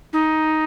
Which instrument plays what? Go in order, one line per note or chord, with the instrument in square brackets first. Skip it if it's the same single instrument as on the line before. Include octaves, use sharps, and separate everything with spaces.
[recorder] D#4